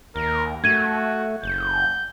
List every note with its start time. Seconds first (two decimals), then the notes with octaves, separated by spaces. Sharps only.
0.16 D#2 A#4
0.64 A3 F#4 G#6 D#7
1.43 F#1 G6